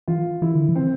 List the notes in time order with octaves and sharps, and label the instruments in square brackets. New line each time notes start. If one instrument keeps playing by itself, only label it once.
[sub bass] E3 [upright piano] F4
[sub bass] E3 [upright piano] E4
[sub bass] D3
E3
[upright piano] C4